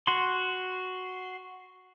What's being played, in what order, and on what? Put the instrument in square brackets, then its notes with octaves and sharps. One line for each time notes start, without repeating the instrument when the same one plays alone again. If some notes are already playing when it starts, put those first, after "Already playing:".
[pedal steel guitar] F#4 C6